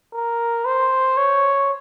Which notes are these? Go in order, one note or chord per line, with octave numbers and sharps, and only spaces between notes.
A#4
C5
C#5